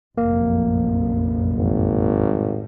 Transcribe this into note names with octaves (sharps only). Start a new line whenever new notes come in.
F1 A#1 F#2 A#3
G#1
A2 G3